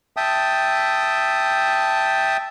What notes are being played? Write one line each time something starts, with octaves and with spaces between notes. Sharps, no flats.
E5 G5 A5 D#6